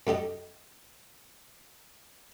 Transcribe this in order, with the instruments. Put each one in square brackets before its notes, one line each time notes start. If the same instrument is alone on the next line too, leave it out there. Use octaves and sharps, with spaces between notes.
[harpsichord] F#2 A3 G4 D#5